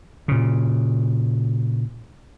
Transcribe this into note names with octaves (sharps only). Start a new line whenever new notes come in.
A#2 C#3